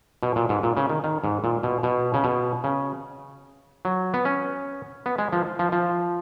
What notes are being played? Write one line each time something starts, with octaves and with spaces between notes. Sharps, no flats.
B2
A#2
G#2
A#2
C#3
D#3
D#3
G#2
A#2
B2
B2
C#3
B2
C#3
F#3
B3
C#4
B3
G#3
F3
F3
F3